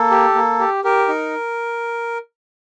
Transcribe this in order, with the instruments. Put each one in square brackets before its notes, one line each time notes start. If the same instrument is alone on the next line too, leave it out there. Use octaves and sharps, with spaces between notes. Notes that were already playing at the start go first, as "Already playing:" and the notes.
Already playing: [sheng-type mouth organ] A#3 A4
G4
A#3
G4
G4 A#4
D#4